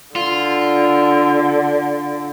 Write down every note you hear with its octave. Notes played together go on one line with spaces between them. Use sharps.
D3 F4